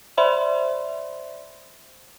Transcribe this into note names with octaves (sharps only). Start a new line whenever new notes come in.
C5 D5 E5 B5 C6